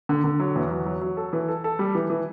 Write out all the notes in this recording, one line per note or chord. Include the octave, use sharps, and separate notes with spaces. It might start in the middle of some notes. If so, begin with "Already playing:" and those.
D3
D3
F#3
E2
F#3
F#3
F#3
A4
E3
A4
A4
G3
E3
E3